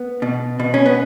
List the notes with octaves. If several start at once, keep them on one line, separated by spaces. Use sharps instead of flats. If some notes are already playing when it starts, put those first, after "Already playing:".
Already playing: B3
B2
B2
C#4
B3